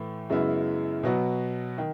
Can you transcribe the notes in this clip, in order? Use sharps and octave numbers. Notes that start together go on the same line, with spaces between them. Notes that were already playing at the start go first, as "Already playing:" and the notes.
Already playing: A2 E3 A3
F#2 C#3 G#3 B3 E4
B2 F#3 B3 F#4
D#3